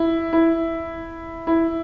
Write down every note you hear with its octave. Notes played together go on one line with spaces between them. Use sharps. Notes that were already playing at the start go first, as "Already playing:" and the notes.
Already playing: E4
E4
E4